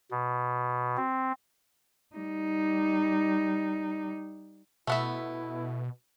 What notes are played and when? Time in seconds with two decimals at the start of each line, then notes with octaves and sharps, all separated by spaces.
0.11 B2
0.97 C4
2.16 G3 D#4
4.87 B2 A3 B3 E4 E5